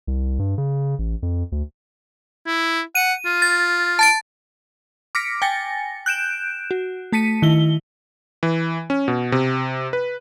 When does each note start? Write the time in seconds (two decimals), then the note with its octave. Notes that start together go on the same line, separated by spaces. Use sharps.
0.07 C2
0.39 G2
0.58 C#3
0.99 A1
1.23 F2
1.52 D2
2.46 E4
2.95 F#5 D#7
3.26 F4
3.42 A6
3.99 A5 A6 D7
5.15 D6 F6 A#6 B6 C#7 D7
5.42 G5 G#5 A6 A#6 C#7
6.06 F#6 G6 D7 E7
6.71 F#4
7.12 A3 A5 B6 C#7 D#7
7.42 D#3 E4 G7
8.43 E3
8.90 C#4
9.08 B2
9.32 C3
9.93 B4